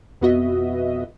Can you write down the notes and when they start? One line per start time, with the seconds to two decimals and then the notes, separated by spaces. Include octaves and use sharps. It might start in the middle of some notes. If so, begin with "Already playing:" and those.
0.21 F2 B2 B3 F#4 D#5 E5